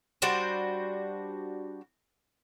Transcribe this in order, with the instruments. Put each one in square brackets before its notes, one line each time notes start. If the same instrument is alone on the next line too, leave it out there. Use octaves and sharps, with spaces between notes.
[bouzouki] G3 D4 F#4 C5